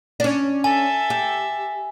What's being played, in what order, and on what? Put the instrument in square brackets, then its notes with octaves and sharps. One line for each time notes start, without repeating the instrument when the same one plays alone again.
[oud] C#4 D4
[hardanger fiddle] A4 E5 [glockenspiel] G#5
[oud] G4